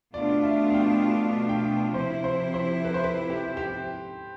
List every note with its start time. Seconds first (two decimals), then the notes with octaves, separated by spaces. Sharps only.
0.14 B2 A3 D4 F4 D5
0.43 E5
0.70 F5
0.74 G5
1.49 G5
1.94 C3 F3 C4 E4 C5
2.24 C5
2.54 C5
2.84 B4
2.94 C5
3.04 B4
3.30 G4
3.57 G4